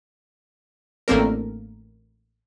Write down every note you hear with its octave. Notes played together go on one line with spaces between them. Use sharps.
A1 A3 A#3 C4 D4 A#4